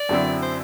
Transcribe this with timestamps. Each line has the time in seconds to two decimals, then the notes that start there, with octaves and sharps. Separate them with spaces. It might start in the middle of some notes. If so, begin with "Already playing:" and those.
Already playing: D5
0.09 F#2 D3 F#3 C4 E4
0.42 C5